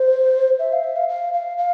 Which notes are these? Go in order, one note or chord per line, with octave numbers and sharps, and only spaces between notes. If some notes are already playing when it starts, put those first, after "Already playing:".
Already playing: C5
E5
F5
E5
F5
F5
F5
F5